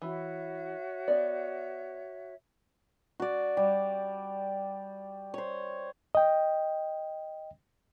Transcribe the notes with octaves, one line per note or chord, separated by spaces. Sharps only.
E3 F#4 C#5 E5
B3 D5
F#4 D5
G3
C5 C#5
D#5 G5